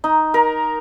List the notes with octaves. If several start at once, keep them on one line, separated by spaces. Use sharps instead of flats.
D#4
A#4